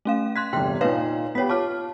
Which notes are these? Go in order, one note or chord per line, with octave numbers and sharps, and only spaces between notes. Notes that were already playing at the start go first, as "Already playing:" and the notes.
A3 C#4 F5
C6 F#6 G#6 B6
G1 E2 C3 G5 C6
A#2 D#4 B4 C#5 F5
B3 G4 C#5 B6
F4 C#5 A5 D6 F6